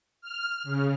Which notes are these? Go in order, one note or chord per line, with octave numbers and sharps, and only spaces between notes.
F6
C#3